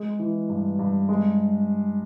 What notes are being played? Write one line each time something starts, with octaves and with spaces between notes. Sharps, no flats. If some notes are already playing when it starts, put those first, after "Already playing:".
Already playing: G#3
E3
G2
G2
G#3